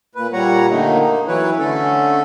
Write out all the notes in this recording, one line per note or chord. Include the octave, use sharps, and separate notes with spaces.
A#2 B4
A#2 G3 C#5 F#5 A#5
A#2 D3 D#3 A3 A#3 D#4
A#3 D#4
E3 F#3 E4 B4 C#5
D3 A3 C#4 A4